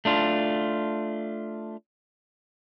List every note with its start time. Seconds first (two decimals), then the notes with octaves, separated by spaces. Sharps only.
0.05 A3 D4 F4